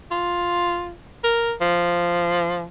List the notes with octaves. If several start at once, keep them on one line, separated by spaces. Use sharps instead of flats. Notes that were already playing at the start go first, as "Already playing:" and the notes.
F4
A#4
F3